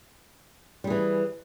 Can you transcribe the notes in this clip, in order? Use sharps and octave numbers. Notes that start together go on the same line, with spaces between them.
E3 G3 G#4